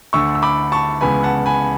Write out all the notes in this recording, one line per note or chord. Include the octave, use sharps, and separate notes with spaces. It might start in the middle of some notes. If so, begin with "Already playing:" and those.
D2 D3 A3 C#6 E6
E6
B5 D6
A5 C#6
C#2 C#3 E3 B3 G#5 B5
F#5 A5
G#5 B5